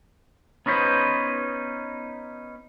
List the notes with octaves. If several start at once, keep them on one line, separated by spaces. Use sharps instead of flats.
B3 C#4 D#4 B4 C5